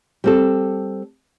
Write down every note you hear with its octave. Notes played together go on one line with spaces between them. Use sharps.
G3 C4 A4